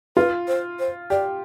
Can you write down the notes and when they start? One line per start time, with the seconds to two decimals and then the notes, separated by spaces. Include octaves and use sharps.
0.16 F4 B4
0.48 C5
0.79 C5
1.10 G4 D5